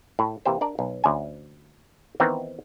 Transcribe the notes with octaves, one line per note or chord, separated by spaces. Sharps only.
A2
C3 E3 A#3 G4 C5
D4 A#4 D5
B1
D2 C#4 G#5
D#3 E3 B3 C4 D#4